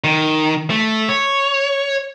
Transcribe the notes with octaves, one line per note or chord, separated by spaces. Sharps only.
D#3
A3
C#5